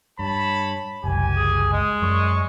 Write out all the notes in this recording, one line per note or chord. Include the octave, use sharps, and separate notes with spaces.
G2 C#5 A5 B5
F#1 C2 G4 G#5
G#4
G#3
F#2 F#3 D5 C#6